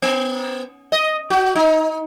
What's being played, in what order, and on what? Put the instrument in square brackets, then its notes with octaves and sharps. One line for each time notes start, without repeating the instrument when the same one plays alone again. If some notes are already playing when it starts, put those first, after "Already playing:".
[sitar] B3
D#5
F#4
D#4